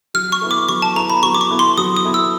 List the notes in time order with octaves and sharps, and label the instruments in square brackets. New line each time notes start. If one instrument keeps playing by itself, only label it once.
[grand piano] F#3 [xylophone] F6
[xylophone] C#6
[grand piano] B3 E4 A4
[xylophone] D6
[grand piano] F#3 [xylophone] C#6
[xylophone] A5
[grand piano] B3 E4 A4 [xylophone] A#5
[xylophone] B5
[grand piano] F#3 [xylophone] C#6
[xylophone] D6
C#6
[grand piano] B3 E4 A4
[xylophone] C6
[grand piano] F#3 [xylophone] D#6
[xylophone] D#6
[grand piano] B3 E4 A4
[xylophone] E6